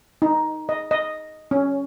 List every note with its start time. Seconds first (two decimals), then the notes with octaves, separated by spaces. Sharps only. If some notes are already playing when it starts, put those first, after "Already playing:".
0.22 D#4
0.69 D#5
0.91 D#5
1.51 C#4